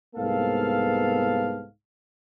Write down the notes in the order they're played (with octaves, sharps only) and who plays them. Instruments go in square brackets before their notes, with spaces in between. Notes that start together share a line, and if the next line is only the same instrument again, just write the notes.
[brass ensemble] C2 G#2 A#3 B3 A4 F5